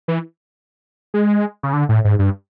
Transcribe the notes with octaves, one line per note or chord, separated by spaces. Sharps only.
E3
G#3
C#3
D3
A2
G#2
G2